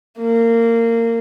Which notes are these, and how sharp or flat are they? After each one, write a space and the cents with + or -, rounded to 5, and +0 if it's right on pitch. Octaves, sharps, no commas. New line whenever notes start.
A#3 -20